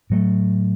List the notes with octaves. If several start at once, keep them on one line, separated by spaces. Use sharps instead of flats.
A2 F#3 A3